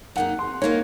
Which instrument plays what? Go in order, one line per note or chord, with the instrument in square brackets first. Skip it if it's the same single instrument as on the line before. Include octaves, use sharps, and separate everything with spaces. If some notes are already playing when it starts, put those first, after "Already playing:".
[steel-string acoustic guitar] F#2 D#3 A#3 D#4 [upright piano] F#5
[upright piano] C6
[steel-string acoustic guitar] D#3 A#3 D#4 [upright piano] C#5